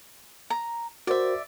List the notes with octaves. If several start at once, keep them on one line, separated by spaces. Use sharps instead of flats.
A#5
F#4 A#4 C5 D5 E5